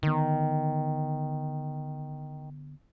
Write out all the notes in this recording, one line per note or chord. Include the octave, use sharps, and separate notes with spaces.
D3 D#3 B3